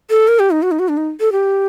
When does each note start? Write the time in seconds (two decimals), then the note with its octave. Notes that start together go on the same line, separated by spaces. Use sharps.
0.10 A4
0.28 A#4
0.39 G4
0.51 D#4
0.62 F#4
0.71 D#4
0.79 F#4
0.89 D4
0.97 D#4
1.20 A4
1.32 G4